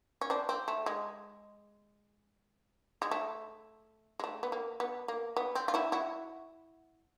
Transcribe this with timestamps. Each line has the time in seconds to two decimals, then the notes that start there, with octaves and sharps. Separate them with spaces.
0.21 C#4
0.30 C4 D4
0.49 C4
0.68 A3
0.86 G#3
3.02 G#3
3.11 A3
4.20 G#3
4.24 A3
4.43 B3
4.52 A#3
4.80 B3
5.08 A#3
5.36 B3
5.55 C4
5.68 F4
5.74 E4 F#4
5.92 E4 F#4